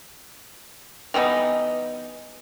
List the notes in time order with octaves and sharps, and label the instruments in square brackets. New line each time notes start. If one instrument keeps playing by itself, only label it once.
[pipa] E3 G3 B3 D#4